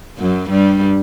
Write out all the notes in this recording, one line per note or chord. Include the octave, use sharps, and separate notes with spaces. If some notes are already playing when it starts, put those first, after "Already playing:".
F#2 F#3
G2 G3